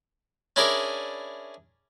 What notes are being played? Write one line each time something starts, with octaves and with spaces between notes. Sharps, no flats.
C#4 D4 E4 G#4 A#4 D5